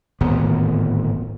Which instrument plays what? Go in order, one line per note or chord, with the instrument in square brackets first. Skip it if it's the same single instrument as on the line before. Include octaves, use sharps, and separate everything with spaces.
[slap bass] D1 G#1 A#2 B3